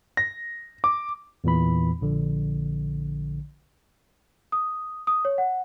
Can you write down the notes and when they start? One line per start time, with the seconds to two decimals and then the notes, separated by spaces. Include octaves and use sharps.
0.17 A#6
0.84 D6
1.44 E2 A#2 E3 B5
2.01 A#1 D3
4.52 D#6
5.07 D#6
5.25 C#5
5.38 F#5